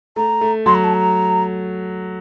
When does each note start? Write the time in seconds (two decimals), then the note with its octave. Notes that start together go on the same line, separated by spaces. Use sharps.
0.16 A3 A#5
0.41 A3
0.66 F#3 C6
0.75 A#5
0.84 A5
0.94 A#5